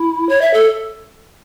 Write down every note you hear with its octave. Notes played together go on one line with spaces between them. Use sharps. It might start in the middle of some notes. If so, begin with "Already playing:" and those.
Already playing: E4
C#5
E5
A4